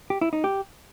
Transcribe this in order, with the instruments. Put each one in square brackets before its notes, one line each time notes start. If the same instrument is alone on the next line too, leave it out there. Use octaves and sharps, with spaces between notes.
[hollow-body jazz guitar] G4
E4
D#4
G4